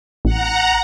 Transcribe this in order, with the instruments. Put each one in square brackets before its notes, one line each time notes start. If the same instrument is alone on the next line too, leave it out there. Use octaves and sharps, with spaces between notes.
[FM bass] A1 [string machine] F#5 A#5